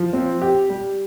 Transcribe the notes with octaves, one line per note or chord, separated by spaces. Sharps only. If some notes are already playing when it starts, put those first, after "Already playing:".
Already playing: F3
C4
G4
G3